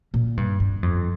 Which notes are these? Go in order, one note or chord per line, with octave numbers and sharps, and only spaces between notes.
A#2
G2
G2
F2